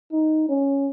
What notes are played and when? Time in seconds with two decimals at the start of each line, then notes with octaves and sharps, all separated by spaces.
0.12 D#4
0.49 C#4